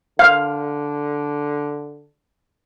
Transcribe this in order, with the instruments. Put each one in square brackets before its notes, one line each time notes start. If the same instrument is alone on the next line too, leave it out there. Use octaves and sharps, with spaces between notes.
[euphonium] D3 [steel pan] F5